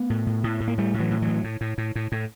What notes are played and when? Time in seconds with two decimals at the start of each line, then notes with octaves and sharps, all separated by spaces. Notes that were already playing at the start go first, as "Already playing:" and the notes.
Already playing: A3 B3
0.10 A2
0.27 A2
0.44 A2
0.60 A2
0.68 A#3
0.78 A2 G3 A3
0.94 A2
0.99 E3 F#3
1.11 A2
1.22 E3 F#3
1.27 A2
1.44 A2
1.61 A2
1.78 A2
1.96 A2
2.12 A2